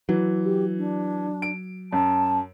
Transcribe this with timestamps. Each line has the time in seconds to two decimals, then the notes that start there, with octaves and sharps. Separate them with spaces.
0.09 E3 F#3
0.44 G4
0.78 D4
1.42 D7
1.93 F#2 A5